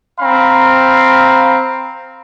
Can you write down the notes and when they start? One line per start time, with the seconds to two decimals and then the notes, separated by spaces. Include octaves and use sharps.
0.20 C4 F5 A#5 B5